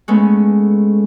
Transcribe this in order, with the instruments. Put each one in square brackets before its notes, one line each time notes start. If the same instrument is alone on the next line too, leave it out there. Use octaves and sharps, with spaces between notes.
[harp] G#3 A3 B3 C#4